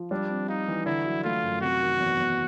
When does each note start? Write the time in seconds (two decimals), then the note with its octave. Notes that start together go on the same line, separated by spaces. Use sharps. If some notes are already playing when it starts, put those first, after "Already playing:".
Already playing: F3
0.11 G3 D4
0.29 C4
0.48 D#4 F4
0.68 E3
0.86 D3 E4
1.06 F#3
1.24 A3 F4
1.43 F#2
1.61 C3 F#4
1.81 D#3
2.00 E2
2.19 E2